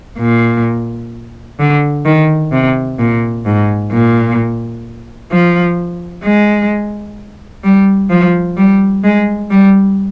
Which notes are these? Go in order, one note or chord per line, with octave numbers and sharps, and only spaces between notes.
A#2
D3
D#3
C3
A#2
G#2
A#2
F3
G#3
G3
F3
G3
G#3
G3